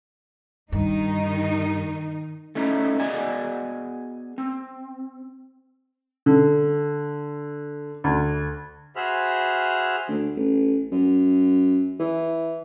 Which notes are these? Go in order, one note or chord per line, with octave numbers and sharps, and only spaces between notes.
G2 D#3 D#4
A3 C#4 D#4 E4
B3 F#4 G#4 D5 D#5 G#5
C4
D3
D2
F#4 G#4 C5 E5 B5 F6
D2
A1
F#2
E3